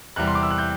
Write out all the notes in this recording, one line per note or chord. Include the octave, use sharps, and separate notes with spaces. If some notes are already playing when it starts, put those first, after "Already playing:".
E2 C3 G3 F#6
C6
D6
E6
F#6
G6